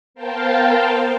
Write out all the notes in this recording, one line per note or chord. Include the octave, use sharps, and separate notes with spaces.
B3 A#4 C5 F5 G5 A5